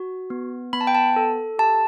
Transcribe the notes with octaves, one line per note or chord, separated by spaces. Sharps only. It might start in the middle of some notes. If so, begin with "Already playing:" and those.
Already playing: F#4
B3
B3 B5
A5
G5
A5
A4
G4 A5